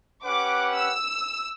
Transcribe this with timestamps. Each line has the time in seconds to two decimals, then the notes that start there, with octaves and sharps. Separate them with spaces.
0.24 C#4 G4 B4 F#5 D6
0.74 E6